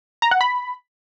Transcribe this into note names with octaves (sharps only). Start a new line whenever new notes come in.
A#5
F#5
B5